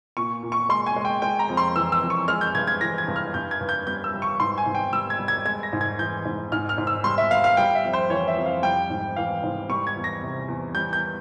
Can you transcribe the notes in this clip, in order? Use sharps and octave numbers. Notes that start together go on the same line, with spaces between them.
A#2 C#6
A#2
C#6
G#3 C6
G#5
G#3
G5
G#3 G5
A#5
F2
C6
E3 E6
E6
F2
C#6
G#3 F6
G6
G2 G#6
G#6
E3 A#6
G#6
G2
F6
G2 G6
G#6
G2
G6
G3 G6
E6
G3
C#6
G#2 C6
G#5
G#2
G5
G3 E6
G#6
G3
G#6
G#3 G#6
A#6
G#2
G#6
E3 G6
G#2
G#2 F6
F6
G#2
E6
G3 C6
E5
G3 F5
F5
G3 G5
E5
F2
C5
E3 C#5
E5
F2
F5
G3 G5
G#2
E3 F5
G#2
G3 C#6
G#6
E2
A#6
C3
E2
G3 G6
G6